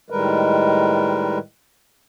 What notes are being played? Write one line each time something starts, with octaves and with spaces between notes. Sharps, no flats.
A2 D#3 G3 G#3 A#4 B4